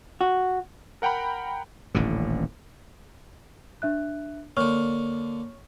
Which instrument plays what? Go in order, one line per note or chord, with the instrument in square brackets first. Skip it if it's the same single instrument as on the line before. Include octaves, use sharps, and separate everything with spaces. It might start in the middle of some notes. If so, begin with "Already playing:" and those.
[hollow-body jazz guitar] F#4
[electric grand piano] A#4 F#5 G5 A#5 B5
[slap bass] D#1 A1 A2 D3
[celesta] D4 E5 F#6
[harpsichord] D3 A#3 [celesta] C#5 C#6 F6